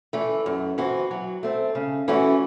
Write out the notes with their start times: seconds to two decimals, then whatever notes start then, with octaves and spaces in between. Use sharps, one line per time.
0.13 E3 A3
0.46 F#2
0.78 E3 C4 F#4
1.11 F#3
1.43 A3 C4
1.75 C#3
2.08 E3 A3 C#4 F#4